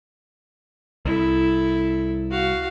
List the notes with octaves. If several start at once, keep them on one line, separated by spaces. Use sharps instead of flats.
C2 E4 A4
F#4 F5